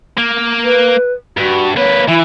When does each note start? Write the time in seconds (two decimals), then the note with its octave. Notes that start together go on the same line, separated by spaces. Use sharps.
0.18 A#3
0.64 B4
1.37 G2 F#4
1.76 A#3 B4 C#5
2.08 E3 E4